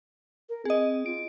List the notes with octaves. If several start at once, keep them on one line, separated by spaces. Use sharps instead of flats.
A#4
C4 G#4 D#5
F4 D7